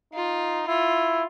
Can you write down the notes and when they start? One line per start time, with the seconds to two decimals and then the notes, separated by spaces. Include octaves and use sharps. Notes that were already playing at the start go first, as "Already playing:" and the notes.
0.13 D#4 F4
0.67 E4 F4